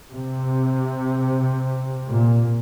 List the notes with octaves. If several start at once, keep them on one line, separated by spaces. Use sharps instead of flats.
C3
A#2